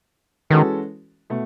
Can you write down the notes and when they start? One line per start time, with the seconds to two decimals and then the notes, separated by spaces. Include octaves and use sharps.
0.50 D#3 E3 G#3 C#4 F#4 A4
1.30 B2 A3